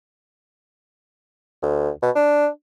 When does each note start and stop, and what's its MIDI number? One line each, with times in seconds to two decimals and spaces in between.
1.62 1.90 38
2.02 2.10 47
2.15 2.48 62